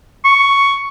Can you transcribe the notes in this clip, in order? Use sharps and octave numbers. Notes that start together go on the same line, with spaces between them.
C#6